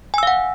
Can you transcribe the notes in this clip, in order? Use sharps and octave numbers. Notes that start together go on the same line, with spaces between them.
F5 F#5 G#5 E6